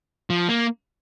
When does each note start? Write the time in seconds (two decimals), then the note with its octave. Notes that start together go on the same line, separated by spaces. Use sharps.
0.30 F3
0.49 A#3